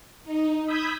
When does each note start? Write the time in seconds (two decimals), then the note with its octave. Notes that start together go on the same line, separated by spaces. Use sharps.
0.24 D#4
0.65 B5 D#6 E6 G6 G#6 B6